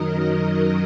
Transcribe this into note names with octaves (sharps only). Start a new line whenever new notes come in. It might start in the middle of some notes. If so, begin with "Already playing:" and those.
Already playing: F#2 D#3 F#3 A#4 D#5